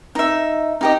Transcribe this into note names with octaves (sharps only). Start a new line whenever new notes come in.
D#4 E5
D#4 G4 D#5